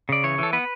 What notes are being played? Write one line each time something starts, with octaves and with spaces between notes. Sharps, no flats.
C#3 D5
E3 C#5
E3 A4
B3 B4